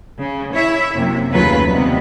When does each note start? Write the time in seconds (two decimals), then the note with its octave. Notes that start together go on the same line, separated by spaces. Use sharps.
0.20 C#3
0.53 E4 C#5 E5
0.94 F#2 C3 A#3
1.31 D#2 C#3 F#3 A3 F4 B4
1.69 D#2 C3 D#3 G3 B3